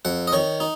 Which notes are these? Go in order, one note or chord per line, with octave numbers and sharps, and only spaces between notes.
F2 F#5
D#5
D#3 C#5
D#4